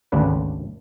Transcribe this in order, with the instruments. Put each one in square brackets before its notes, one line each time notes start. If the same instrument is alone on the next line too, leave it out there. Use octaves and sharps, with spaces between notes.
[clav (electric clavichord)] G#1 D2 C#3 D4 B4